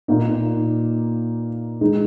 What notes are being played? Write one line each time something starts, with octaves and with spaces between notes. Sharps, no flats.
A#2 A#3 D#4
E3 G#3 D#4